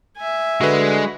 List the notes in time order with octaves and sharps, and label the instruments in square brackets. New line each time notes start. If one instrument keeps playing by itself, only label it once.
[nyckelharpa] E5 G#5
[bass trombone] D3 [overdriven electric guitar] G#3 [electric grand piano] F#4 B4